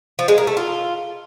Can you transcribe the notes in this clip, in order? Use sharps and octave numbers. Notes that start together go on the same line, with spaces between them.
F3
G#3
A#3
A3
F4